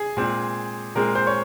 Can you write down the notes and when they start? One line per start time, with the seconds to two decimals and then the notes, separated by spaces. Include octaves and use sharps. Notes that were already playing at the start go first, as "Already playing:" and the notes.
Already playing: G#4
0.17 A#2 G#3 C4
0.95 A#2 G#3 C4 A#4
1.15 C5
1.27 C#5